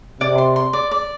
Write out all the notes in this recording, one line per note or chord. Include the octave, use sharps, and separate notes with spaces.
C3 D5
C6
C6
D5
D5